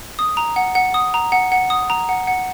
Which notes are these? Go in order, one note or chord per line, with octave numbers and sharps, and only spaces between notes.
D#6
A#5
F#5
F#5
D#6
A#5
F#5
F#5
D#6
A#5
F#5
F#5